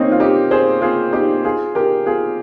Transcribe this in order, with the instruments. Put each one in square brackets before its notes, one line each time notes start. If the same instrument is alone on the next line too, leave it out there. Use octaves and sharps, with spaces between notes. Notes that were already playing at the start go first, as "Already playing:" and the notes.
Already playing: [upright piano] A#3 C4 C#4 D#4
F4
D#4 G4
G#4 C5
F4 G#4
D#4 G4
F4 G#4
G4 A#4
F4 G#4